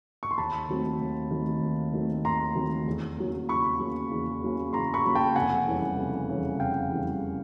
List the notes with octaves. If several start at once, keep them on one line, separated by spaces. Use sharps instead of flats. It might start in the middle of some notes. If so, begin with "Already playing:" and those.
C#6
C6
D#2 A5 B5
D#3 F#3 A3 C4
D#2
D#3 F#3 A3 C4
D#2
D#3 F#3 A3 C4
D#2 A#5 C6
D#3 F#3 A3 C4
E2
C#3 F#3 A#3
E2 B5 C#6
C#3 F#3 A#3
E2
C#3 F#3 A#3
E2 A#5 C6
B5 C#6
C#3 F#3 A#3
G5 A5
F1 F#5 G#5
E2 C#3 E3 G3
F1
E2 C#3 E3 G3
F1 F5 G5
E2 C#3 E3 G3